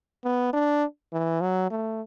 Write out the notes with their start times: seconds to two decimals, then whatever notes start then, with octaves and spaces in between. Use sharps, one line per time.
0.25 B3
0.53 D4
1.13 E3
1.41 F#3
1.71 A3